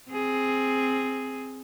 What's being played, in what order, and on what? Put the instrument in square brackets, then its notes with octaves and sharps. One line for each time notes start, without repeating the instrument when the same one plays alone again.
[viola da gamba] C4 G#4